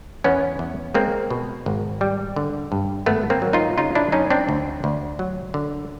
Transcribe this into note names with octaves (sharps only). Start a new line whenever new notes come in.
E2 B3 C#4
E2
G#3 A#3 C4
B2
G#1
G3
D3
G2
G#1 A3 B3
A#3 C4
F#3
D#4 F4
C#3 D#4 F4
D4 E4
F#2 C#4 D#4
C4 D4
D2
D2
F#3
D3